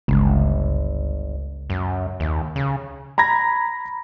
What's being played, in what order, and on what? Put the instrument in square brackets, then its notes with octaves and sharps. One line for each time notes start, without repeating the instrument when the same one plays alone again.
[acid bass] G1 [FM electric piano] C#2
[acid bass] F#2
D#2
C#3
[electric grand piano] A#5 B5 G#6 A#6